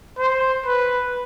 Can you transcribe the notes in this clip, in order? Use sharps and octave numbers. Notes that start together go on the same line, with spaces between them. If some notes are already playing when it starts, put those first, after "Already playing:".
C5
B4